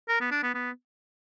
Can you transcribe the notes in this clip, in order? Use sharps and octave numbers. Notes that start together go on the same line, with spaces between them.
A#4
B3
D4
B3
B3